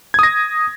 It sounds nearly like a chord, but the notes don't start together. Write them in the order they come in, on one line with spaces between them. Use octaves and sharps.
G#6 D#6 A#6